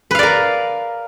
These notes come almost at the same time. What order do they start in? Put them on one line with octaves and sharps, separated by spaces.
B4 F5 D5 A#4